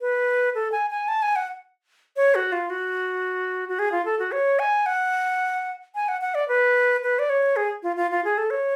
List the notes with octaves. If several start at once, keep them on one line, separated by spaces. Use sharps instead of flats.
B4
A4
G#5
G#5
A5
G#5
F#5
C#5
F#4
F4
F#4
F#4
G#4
F4
A4
F#4
C#5
G#5
F#5
G#5
F#5
F#5
D5
B4
B4
D5
C#5
G#4
F4
F4
F4
G#4
A4
C#5